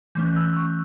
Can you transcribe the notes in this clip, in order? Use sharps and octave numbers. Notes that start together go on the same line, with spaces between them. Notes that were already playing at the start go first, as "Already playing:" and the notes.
E3 A3 C#4 G6
F#6
E6
C#6